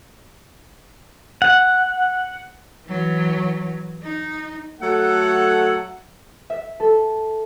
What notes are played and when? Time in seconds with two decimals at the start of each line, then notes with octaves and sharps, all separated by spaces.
1.42 F#5
2.85 E3 F#3
4.02 D#4
4.81 F#3 A3 A4 F#5
6.50 E5
6.80 A4